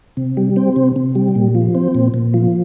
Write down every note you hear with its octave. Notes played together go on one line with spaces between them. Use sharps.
C3
G3
C4
C3
C3
G3
A#2
F3
C4
A#2
A#2
F3